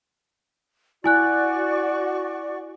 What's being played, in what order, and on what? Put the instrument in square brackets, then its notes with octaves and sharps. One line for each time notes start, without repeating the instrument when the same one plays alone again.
[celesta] E4 G#5 F#6 [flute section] F#4 D5 C#6